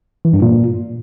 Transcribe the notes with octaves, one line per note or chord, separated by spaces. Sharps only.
E3
G2
A#2